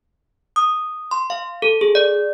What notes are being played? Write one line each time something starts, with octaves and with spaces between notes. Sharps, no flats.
D#6
C6
F5
A4
G#4
D5